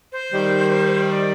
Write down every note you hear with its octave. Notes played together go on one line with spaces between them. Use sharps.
C5
D#3 G3
D5